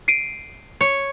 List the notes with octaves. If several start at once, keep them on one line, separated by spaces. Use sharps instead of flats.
C7 D7 D#7
C#5